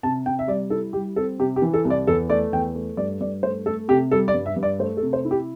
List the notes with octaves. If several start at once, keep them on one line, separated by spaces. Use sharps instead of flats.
C3 A5
C3 G5
E5
G3 D5
E4 A4
G3 G4
C4 A4
C3 G4
G4
E3
A4
C2
D5
E2 A4
A3 D5
E2 G5
A3
G2 D5
G2 D5
A3 C5
A3 A4
C3 G4
G3 A4
D5
G2
E5
G2
D5
A3 C5
A4
C3
C5
E4
G4